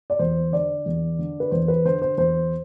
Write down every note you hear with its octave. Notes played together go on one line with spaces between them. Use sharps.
D5
E2 C5
D3 D5
E2
D3
B4
E2 C5
B4
D3 C5
C5
E2 C5